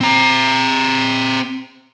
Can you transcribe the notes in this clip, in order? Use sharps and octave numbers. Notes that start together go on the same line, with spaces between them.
C4 A#5